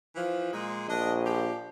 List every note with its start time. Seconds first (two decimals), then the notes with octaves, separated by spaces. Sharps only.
0.16 E3 F3
0.53 A#2 G#3
0.89 A#1 D4 D#5
1.24 F3 G4